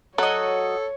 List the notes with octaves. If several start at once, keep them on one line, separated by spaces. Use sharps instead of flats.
F#3 F#4 A4 C#5 D#5